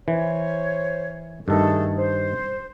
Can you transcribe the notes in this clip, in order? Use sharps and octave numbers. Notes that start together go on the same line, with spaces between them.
E3 C5 C#5
G2 D#3 A3 G#4 A4
C5